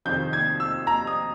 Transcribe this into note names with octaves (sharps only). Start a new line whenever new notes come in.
F2 C3 D#3 G6
G#6
E6
A#5
D#6